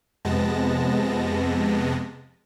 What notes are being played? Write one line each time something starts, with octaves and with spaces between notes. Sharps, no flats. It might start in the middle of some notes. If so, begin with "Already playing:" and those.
F2 C3 G#3 B3 A5 A#6